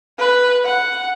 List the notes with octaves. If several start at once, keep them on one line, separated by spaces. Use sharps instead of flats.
B4
F#5